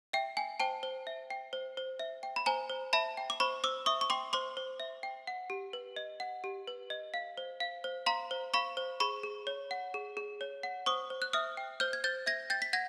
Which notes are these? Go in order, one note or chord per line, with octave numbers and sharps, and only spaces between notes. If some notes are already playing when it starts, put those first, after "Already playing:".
E5 G5
G5 G#5
C5 G5 A5
C5
E5
G5
C5
C5
E5
G5
B5
C5 G#5 A#5
C5
E5 A5 B5
G5
D6
C5 B5 C#6
C5 D6 E6
E5 C#6 D#6
C#6
G5 C6 D6
C5 C6 D6
C5
E5
G5
F#5
G4
B4
D#5
F#5
G4
B4
D#5
F5
C5
F5
C5
F5 A#5 C6
C5
F5 B5 C#6
C5
G#4 B5 C#6
G#4
C#5
F#5
G#4
G#4
C#5
F#5
C5 C#6 D#6
C5
F#6
E5 D#6 F6
G5
C5 F6 G6
G#6
C5 G6 A6
E5 G#6 A#6
G5 G6 A6
B6
F#5 G#6 A#6